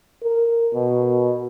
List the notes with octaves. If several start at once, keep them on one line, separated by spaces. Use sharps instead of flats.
A#4
B2